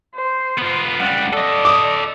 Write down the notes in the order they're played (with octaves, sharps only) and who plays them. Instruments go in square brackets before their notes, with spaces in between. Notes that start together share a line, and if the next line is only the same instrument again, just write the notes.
[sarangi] C5
[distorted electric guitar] B3 F4
[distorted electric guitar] C#2 G3 [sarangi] F#5
[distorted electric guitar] A4 D#5 [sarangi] D5
[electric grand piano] D6 D#6